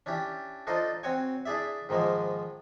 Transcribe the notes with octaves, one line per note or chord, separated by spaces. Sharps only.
C#4 D4 E4 G4
D4 D#4 F4 A4 C5 D#5
C4 F#4 C#5 G#5
D4 E4 G#4 D5 E5
G#2 D#3 F3 G#3 A#3